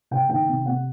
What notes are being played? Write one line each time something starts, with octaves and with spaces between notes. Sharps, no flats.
C#3 G5
D#3 G5
C3
C3 F#5